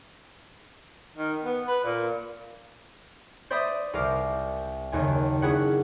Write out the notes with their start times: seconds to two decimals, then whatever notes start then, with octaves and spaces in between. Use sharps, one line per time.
1.16 D#3
1.43 B3
1.67 B4
1.84 A#2
3.50 C5 D5 E5 B5 D#6
3.93 C2 A#4 F5 D6
4.92 F#1 D#2 G#5
5.42 C#4 D4 E4 G#4 F#5